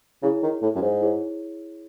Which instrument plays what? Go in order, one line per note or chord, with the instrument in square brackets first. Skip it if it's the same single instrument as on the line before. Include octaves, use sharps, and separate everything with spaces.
[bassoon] C#3 [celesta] E4 G#4 C#5
[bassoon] D#3
A2
F#2
G#2
[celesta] E4 G#4 C#5